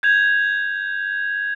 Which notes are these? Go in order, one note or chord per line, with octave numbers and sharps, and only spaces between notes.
G6 G#6 F7